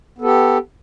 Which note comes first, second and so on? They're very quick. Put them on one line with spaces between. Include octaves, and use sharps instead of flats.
B3 A4 G4